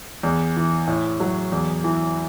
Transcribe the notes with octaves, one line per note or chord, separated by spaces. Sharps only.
E2
E3
A2
F#3
E2
E3